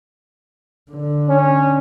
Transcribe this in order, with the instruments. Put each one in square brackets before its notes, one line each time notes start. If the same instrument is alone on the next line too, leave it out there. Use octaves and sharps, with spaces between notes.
[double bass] D3
[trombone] C#4